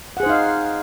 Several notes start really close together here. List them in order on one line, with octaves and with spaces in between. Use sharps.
F#5 G#4 C5 D#4 F5